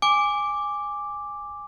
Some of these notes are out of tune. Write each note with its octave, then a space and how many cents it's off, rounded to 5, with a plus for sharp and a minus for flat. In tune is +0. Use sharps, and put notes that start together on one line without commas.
G#5 -10 D6 +0